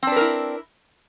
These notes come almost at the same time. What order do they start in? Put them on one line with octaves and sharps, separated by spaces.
C4 D4 B4 A#4 E4